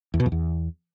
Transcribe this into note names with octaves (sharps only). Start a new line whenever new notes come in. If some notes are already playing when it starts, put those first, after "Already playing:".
E2
B2
F2
E2